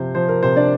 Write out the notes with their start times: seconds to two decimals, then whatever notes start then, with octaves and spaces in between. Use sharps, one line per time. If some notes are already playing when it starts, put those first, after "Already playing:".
Already playing: C3 F3 C5
0.15 F3 C5
0.29 A#4
0.43 C3 C5
0.56 D4 D5